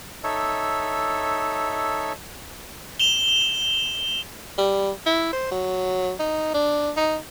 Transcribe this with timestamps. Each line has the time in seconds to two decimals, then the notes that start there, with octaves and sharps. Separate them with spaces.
0.24 D#4 A4 C#5 E5
3.00 E7 F7 G7
4.58 G3
5.06 E4
5.33 C5
5.51 F#3
6.19 D#4
6.54 D4
6.97 D#4